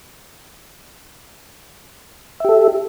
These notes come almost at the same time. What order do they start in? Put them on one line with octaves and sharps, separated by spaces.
E5 G4 A4